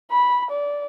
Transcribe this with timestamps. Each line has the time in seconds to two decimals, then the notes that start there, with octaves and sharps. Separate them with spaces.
0.12 B5
0.50 D5